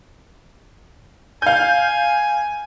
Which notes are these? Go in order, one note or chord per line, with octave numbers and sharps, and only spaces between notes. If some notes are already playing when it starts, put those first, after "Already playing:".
F5 G#5 G6